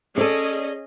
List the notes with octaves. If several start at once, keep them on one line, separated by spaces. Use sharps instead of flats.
C#4 G#4 A4 D5 D#5